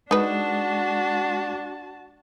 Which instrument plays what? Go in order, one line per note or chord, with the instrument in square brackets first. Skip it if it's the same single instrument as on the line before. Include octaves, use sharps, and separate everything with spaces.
[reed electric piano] G#3 [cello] D4 [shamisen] D#4 B4 [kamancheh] F#4 A5